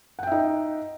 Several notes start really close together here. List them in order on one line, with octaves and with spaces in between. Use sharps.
F#5 G5 E5 D#4